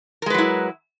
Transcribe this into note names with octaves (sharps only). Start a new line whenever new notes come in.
F#3 G#3 E4 A#4 B4